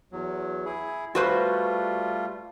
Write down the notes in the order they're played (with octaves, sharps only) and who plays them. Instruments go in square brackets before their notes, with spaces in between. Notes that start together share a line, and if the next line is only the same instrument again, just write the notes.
[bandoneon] E2 F#3
E4 G#4
[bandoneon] G3 A3 F4 [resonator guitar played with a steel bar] F#4 B4 C5